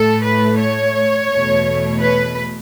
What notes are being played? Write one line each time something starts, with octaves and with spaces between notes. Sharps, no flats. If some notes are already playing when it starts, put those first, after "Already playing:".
Already playing: A2 A3 A4
B4
C#5
E2 B2 A3
B4